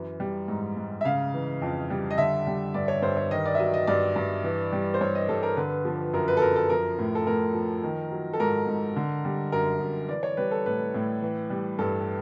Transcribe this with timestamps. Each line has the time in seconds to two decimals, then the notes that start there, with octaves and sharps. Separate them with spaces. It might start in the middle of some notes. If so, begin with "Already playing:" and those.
Already playing: F#2 E3
0.20 G3
0.48 G#2
0.77 G#2
1.01 E5
1.05 C#3 F5
1.34 E3
1.62 F2
1.90 G3
2.11 D#5
2.18 D3 E5
2.47 G3
2.74 G2 D5
2.88 C#5
3.02 G2 C5
3.17 C#5
3.31 D#3 D#5
3.46 D5
3.55 E5
3.59 F#3 D#5
3.74 D#5
3.87 G2 D5
4.16 G2
4.44 E3
4.73 G3
4.94 C5
5.01 G2 C#5
5.15 D#5
5.29 G2 A4
5.43 A#4
5.57 D3 B4
5.85 F3
6.13 F#2 A#4
6.28 B4
6.37 A4
6.42 F#2 A#4
6.56 A4
6.70 F3 A#4
6.98 A2
7.15 A4
7.27 A2 A#4
7.54 F3
7.83 D#3
8.12 F#3
8.33 A4
8.40 G#2 A#4
8.68 G#2
8.96 D3
9.25 G3
9.52 F#2 A#4
9.81 F#2
10.09 E3 D5
10.23 C#5
10.37 G3 B4
10.51 A4
10.66 A2 B4
10.94 A2
11.22 E3
11.50 G3
11.79 G2 A4